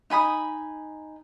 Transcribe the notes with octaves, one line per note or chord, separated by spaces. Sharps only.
D#4 G#5 B5 D#6